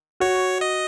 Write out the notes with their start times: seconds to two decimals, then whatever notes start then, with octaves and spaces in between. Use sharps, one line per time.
0.20 F#4 C#5
0.61 D#5